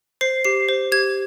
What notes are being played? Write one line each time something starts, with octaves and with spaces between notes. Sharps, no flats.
C5 C7
G4 C7
C5
G4 G#6